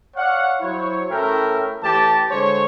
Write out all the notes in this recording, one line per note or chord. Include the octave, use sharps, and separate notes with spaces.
C#5 D5 F5 F#5
F#3 E4 C5 C#5
A2 A3 C#4 A#4 E5 G5
A2 E3 G4 A5
D3 G#3 C5 C#5